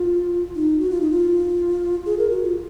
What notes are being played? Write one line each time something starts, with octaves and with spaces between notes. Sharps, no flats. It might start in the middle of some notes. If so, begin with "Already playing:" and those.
Already playing: F4
D#4
F#4
F4
D#4
F4
G#4
A#4
F#4
F4